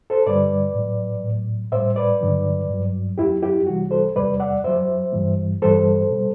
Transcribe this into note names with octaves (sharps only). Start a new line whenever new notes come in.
A4 C5
G2 D3 G3 B4 D5
A2 F#3
A2 F#3
A2 G3 C5 E5
B4 D5
G2 D3 F#3
G2 F#3
F#2 F#3 E4 G4
E4 G4
C2 C3 E3 G3 F#4
A4 C5
E2 C3 G3 B4 D5
D5 F#5
F#2 F#3 C5 E5
G2 E3 G3
G2 E3 G3 A4 C5
B2 G3